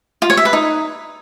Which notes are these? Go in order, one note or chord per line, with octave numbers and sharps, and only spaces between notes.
F4
C#5
E5
B4
D#4